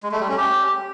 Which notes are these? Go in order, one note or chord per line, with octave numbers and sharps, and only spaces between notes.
G#3
A3
G3
C#4
G4